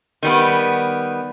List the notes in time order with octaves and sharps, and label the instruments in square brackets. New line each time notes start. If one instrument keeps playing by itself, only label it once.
[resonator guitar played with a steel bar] D#3 G3 B3